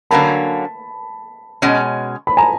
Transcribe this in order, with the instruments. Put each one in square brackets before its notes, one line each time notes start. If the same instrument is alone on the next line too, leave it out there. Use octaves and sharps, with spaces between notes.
[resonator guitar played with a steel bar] D3 F#3 A#3 C#4 [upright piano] A5 B5
[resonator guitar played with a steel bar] B2 G#3 C#4
[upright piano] B5
G#5 A#5